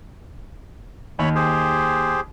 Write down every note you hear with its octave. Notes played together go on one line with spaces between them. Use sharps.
D#2 C#5 B5
G4 G#4 C5